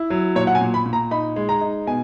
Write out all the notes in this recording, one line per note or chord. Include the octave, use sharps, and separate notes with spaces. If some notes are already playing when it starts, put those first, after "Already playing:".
Already playing: E4
F#3
A#2 C#5
F#5
G#5
A#2
B5
A#2
A#5
D#4 B5
G#3
A#5
D#4
B2 G#5